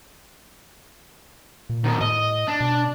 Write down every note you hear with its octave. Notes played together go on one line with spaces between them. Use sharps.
A#2
B2 D#3
A2 D#5
D4
B2